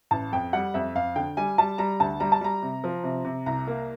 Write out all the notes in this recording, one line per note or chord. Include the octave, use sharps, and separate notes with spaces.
A1 A5
F2 G5
G3 F#5
F2 E5
F2 F5
D3 G5
G3 G#5
G3 A5
G3 A#5
D2 A5
G3 A#5
A5
G3 A#5
C3
F3
C3
C3
C2 A#5
A#3